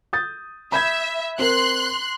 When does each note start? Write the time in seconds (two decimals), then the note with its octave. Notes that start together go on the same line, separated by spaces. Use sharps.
0.13 D#6 G6 A6
0.72 E5 B5 G6 G#6
1.39 C4 A#4 C6 F#6